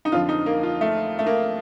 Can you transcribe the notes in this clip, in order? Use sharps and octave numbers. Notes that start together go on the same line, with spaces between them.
D#4
F2 D3 F3 F4
D#4
A#3
F4
A3
A3
A#3